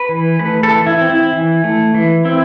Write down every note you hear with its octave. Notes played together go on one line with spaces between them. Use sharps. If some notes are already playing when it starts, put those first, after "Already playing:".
Already playing: B4
E3
A3 B4
A4
E3
E4
C4
E4
E3
A3
E3
C4 E4